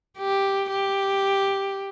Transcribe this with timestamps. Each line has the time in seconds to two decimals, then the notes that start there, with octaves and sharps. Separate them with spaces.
0.19 G4
0.71 G4